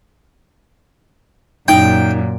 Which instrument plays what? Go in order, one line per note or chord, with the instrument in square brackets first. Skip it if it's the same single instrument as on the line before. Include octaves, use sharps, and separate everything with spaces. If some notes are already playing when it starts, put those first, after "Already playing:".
[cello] F#2 A#2 [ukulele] D#4 [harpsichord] G5